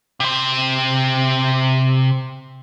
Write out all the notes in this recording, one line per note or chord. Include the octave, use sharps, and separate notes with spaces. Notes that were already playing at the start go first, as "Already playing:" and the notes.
C3 C5